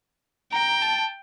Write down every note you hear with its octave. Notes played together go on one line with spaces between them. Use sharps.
G5 A#5
A5